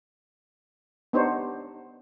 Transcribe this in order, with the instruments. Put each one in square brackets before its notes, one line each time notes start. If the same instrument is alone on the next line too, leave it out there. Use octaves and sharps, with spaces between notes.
[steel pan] B3 D4 D#4 G4 C5 C#5